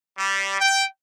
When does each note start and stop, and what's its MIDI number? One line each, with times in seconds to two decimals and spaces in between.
0.18 0.58 55
0.60 0.85 79